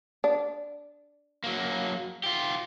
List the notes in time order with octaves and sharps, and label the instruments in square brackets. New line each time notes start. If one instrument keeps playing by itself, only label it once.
[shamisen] D4
[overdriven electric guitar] F#3 A#3
F4 G4